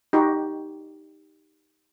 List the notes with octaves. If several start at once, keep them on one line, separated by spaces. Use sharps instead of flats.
D#4 F#4 G4